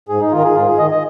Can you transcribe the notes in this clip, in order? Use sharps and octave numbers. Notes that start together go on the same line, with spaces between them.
G#2 G#4
D#4
D#3 F4
A#4
G#4
G#2 F4
G#4
D#3 D#5
D#5